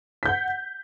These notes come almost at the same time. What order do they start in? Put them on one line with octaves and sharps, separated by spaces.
B6 G6 F#5